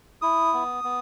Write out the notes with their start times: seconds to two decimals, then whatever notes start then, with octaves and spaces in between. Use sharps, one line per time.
0.22 E4 D#6
0.53 B3
0.84 B3